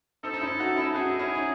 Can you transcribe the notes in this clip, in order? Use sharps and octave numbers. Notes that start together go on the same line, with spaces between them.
C4 D#4 A4
D#4
C#4 E4
D#4 F#4
C#4 E4
D#4 F#4 G#4
C#4 E4
D#4